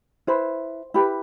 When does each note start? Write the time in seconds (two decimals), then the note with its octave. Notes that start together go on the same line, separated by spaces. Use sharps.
0.27 E4 B4 C5
0.94 E4 G4 B4